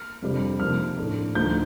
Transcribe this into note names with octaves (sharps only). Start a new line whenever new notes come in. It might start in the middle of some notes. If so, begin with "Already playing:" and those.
Already playing: F6
F2 C3 G3 D4
C3 F3 A#3 D#4 F6
A2 A3 D4
D2 D3 F3 A3 D#4 G6